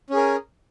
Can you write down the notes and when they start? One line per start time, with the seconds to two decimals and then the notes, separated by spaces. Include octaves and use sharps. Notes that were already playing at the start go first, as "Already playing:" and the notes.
0.10 C#4
0.13 G#4
0.17 A#4